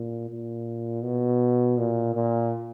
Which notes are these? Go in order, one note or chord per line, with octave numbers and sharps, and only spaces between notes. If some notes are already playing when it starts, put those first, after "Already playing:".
Already playing: A#2
A#2
B2
A#2
A#2